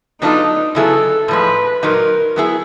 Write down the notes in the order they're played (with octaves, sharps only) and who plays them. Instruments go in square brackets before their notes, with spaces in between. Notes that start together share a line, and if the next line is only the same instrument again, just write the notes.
[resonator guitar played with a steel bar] F#3 B3 D4 F4 A4 [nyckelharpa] D#4
[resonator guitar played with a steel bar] C#3 F#3 B3 E4 G#4 [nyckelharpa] A4
[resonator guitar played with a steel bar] A2 F3 G#3 [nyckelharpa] B4
[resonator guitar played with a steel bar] A#2 F#3 A#3 D#4 [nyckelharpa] A#4
[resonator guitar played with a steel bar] F#3 B3 E4 G#4